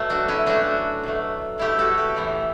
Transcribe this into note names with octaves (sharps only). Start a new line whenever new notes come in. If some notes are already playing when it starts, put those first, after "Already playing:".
Already playing: B2 F#3 A3
D4 F#4
C#4 E4
B2 F#3 A3 D4 F#4
B2 F#3 A3
B2 F#3 A3 E4 G4
F#4 A4
G4 B4
A2 E3 B3